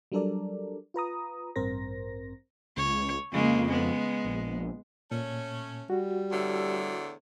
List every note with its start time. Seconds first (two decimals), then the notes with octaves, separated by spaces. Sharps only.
0.12 F#3 G3 D4 A4 A#4 D5
0.94 F4 B4 A#5 D#6
1.56 A1 G2 C4 A#4 C5 A#6
2.77 C#2 C#5
3.32 F2 C#3 G#3 A#3
3.69 G#3 B3
4.25 A#1
5.11 A#2 A3 C#4
5.90 G3 F#4
6.32 E2 A2 D3